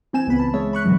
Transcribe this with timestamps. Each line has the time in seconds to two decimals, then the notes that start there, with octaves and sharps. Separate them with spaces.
0.13 E3 C4 G#5 E7
0.27 C#2 B3 B5
0.40 A5
0.53 G#3 C#5 E5
0.73 B5 C#6 F#6
0.84 B2 D3 E3 F#3 G#3